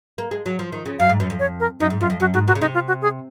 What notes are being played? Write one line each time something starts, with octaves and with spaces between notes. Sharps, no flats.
A#3
G#3
F#3
F3
D#3
C#3
F#2 F5
G#2
F#2
F2
C#5
A#4
F#2 D#4
G#2
F#2 F4
F2
F#2 F#4
G#2 F#4
A#2 F#4
C#3
C3 D#4
F4
F#4
G#4